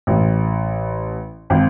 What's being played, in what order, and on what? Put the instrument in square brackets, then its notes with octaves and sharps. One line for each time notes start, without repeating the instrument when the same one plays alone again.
[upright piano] A1
G#1